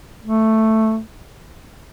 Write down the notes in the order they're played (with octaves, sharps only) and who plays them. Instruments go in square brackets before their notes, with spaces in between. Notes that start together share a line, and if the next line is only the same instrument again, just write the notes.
[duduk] A3